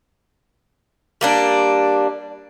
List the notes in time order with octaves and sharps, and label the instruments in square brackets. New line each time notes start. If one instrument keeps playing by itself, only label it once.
[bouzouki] G3 A#3 D4